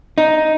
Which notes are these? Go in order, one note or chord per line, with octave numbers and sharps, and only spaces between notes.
D#4